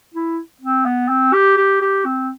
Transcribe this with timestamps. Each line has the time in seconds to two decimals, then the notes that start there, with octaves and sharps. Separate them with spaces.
0.14 E4
0.61 C4
0.85 B3
1.09 C4
1.33 G4
1.57 G4
1.81 G4
2.05 C4